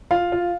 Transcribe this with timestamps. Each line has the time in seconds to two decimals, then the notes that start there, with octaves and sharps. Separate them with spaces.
0.11 F4 F5
0.32 F4